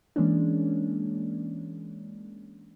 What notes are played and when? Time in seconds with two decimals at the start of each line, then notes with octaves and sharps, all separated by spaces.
0.16 E3 G#3 A#3 C#4 D4